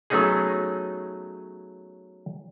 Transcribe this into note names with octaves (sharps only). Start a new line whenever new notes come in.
F#3 A3 B3 C#4 D#4 G#4